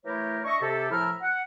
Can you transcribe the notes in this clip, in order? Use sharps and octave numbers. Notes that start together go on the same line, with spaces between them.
E3 A3 E4 G4 A#4 C#5
D4 D#5 E5 C#6
C3 G4 A4
A2 F3 E4 A#4 E5 F6
F#5